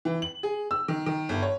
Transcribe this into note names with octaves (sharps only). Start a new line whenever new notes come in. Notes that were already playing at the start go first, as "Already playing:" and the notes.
E3
F#7
G#4
E6
D#3
D#3
G1
C#5